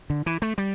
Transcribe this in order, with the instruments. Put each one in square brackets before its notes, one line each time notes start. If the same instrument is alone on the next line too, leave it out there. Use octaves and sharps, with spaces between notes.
[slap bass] D3
E3
A3
G3